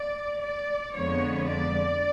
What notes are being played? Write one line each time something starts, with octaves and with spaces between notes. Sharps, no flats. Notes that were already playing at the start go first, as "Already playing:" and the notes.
Already playing: D5
D5
F2 D3 F3 G#3 B3 C#5
D5